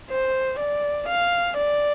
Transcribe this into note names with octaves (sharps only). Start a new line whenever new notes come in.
C5
D5
F5
D5